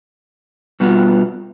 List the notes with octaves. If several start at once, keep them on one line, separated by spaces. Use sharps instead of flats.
B2 G3 B3 F4